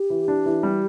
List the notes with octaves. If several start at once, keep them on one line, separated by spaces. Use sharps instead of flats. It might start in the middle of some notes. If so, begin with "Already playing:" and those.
Already playing: G4
E3
D4
E3
G3